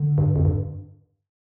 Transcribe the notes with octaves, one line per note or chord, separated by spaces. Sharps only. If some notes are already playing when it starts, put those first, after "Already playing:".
Already playing: D3
G2
F2
G2